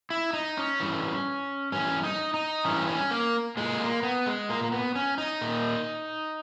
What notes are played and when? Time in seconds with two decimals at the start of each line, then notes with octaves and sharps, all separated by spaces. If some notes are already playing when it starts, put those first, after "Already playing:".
0.10 E4
0.33 D#4
0.57 C#4
0.80 G2 E3
1.72 G2 E3 C#4
2.04 D#4
2.34 D#4
2.65 G2 E3 C#4
2.88 C#4
3.11 A#3
3.57 A#2 G#3
3.80 A#3
4.03 B3
4.26 G#3
4.49 A#2 A#3
4.64 A#3
4.72 B3
4.95 C#4
5.18 D#4
5.41 A#2